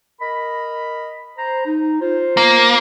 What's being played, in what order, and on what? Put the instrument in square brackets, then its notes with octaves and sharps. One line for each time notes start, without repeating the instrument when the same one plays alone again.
[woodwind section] A#4 D#5 B5
C5 A#5
D#4
F4 C5
[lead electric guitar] A#3